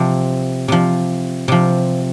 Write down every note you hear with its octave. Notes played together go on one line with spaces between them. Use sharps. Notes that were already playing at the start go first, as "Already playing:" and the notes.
Already playing: C3 F3
C3 F3
C3 F3